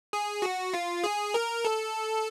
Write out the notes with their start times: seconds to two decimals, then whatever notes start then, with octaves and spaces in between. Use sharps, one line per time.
0.13 G#4
0.42 F#4
0.74 F4
1.04 G#4
1.34 A#4
1.65 A4